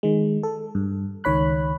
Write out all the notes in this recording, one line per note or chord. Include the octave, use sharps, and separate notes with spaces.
D#3 G#3
A4
G2
C#2 D#3 C#5 B5 F#6